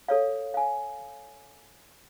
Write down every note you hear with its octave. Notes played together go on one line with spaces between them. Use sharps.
A4 C#5 F5
F5 G#5